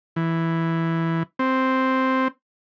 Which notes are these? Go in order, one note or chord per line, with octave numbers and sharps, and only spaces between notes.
E3
C4